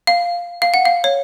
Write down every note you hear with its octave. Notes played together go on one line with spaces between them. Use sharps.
F5
F5
F#5
F5
C#5